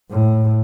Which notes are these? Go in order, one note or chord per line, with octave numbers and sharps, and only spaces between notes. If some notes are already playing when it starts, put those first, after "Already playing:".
A2